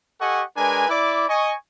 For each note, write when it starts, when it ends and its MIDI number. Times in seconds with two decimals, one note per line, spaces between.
0.20 0.43 67
0.20 0.43 69
0.20 0.43 75
0.20 0.43 78
0.20 0.43 80
0.20 0.43 85
0.57 0.87 56
0.57 0.87 62
0.57 0.87 70
0.57 0.87 71
0.57 0.87 80
0.89 1.27 64
0.89 1.27 74
0.89 1.27 86
1.28 1.53 75
1.28 1.53 80
1.28 1.53 85